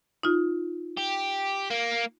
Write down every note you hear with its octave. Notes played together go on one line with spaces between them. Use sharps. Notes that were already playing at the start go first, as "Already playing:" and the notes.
D#4 F4
G4
A#3